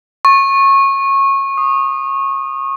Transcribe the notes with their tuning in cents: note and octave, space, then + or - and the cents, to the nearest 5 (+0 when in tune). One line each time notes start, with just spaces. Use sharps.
C#6 -20
D#6 -25